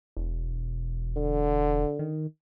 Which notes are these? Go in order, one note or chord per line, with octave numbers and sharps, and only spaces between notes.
E1
D3
D#3